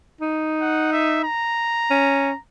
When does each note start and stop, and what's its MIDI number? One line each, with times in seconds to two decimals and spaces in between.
0.21 1.24 63
0.61 0.89 78
0.92 1.20 76
1.24 2.39 82
1.91 2.32 61